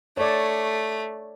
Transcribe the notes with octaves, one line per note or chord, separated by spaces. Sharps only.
A3 C#5 D5